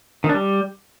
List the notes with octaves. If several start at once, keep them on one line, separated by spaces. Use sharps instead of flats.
D#3
D4
G3